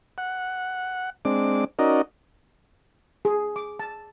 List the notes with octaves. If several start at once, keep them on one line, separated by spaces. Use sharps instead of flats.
F#5
G#3 C4 D4 D6
C#4 D#4 F#4 A#4 D5 D#5
G#4
D6
A5